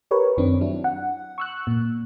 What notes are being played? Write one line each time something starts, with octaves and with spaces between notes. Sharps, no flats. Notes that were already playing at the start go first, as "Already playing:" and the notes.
G4 A#4 B4 C#5
F#2 D#3 C4 D4
F#3 D4 E4
F#5
C#6 E6 F#6
A#2